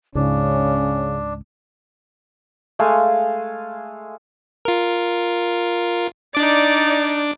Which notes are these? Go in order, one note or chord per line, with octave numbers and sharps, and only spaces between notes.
C#2 G#2 C#3 C#4 D4
G#3 A3 F5 G#5
F4 A#4
D4 D#4 D5 D6